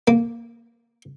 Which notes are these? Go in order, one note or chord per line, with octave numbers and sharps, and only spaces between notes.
A#3